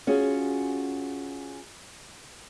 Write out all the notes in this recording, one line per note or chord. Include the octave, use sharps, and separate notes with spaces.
C#4 F4 F#4 G#4